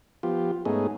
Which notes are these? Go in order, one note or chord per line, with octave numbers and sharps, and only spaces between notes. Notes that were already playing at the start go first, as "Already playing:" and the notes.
F3 B3 F4 G4
G#2 A3 B3 C#4 D#4 G#4